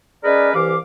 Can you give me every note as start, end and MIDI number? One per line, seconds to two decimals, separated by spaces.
0.24 0.50 56
0.24 0.50 61
0.24 0.50 68
0.24 0.50 70
0.24 0.50 71
0.24 0.50 74
0.55 0.77 36
0.55 0.77 52
0.55 0.77 67
0.55 0.77 77
0.55 0.77 86